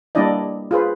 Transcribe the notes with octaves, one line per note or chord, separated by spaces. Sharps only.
G3 A#3 D4 E4 D5 D#5
F4 G#4 B4 C5